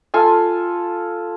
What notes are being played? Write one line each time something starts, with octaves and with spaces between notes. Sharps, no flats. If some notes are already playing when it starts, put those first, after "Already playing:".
F4 A4 G#5